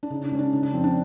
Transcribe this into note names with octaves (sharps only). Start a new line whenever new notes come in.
D4
C#3 D#4
D4
C#2 C#4
D4
C#3 D#4
D4
F2 C4
D4